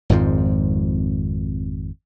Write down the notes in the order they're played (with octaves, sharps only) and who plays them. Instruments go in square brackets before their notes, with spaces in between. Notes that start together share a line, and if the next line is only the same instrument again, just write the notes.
[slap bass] G#1 F2 G#2 F3